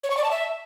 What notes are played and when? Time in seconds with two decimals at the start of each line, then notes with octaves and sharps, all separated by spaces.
0.04 C#5
0.10 C#6
0.17 D5
0.24 A5
0.31 E5